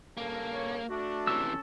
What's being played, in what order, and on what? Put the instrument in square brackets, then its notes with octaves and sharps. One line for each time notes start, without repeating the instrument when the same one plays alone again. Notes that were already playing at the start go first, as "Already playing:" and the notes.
[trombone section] G2 C#3 A4 [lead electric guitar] A#3
[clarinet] C#5
[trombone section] A3 D4 [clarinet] F#4
[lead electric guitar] C3 E3 [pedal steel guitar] C#4 A4 E6